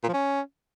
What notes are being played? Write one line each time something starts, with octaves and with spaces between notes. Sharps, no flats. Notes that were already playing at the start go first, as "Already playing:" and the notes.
A#2
F3
C#4